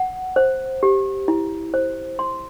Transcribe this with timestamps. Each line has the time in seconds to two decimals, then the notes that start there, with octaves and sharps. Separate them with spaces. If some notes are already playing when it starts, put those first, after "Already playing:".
Already playing: F#5
0.36 C5
0.83 G4
1.28 E4
1.74 C5
2.19 C6